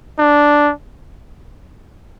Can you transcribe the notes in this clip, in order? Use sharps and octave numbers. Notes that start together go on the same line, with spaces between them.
D4